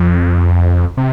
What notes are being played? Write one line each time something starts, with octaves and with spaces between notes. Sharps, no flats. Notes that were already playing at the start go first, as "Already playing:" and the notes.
Already playing: F2
C3